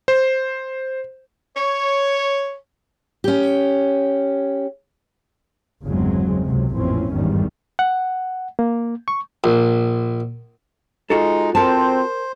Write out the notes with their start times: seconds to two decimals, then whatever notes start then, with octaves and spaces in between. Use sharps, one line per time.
0.08 C5
1.55 C#5
3.24 C#4 G4
5.83 G1 E2 C#3 F#3 G#3 C4
6.45 C#2 C3 F#3
6.74 A1 F2 A#2 E3 C4 C#4
7.10 G#1 E2 G2 D#3 G3
7.79 F#5
8.59 A#3
9.08 C#6
9.44 A#1
11.10 G#3 D#4 F4 F#4 A4
11.55 C4 A#4 C5 A5